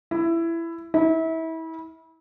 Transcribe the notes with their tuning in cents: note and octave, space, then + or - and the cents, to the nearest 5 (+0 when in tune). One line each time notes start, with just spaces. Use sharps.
E4 +15
E4 -30